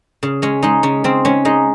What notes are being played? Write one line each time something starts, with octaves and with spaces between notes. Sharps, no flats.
C#3
G#3 C#4
G#3 D#4
C#3 C#4
C#3 C4
G#3 C#4
G#3 D#4